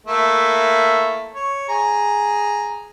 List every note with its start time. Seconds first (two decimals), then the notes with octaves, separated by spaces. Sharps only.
0.07 A3 A#3 E4
1.35 C#5
1.69 G#4 A#5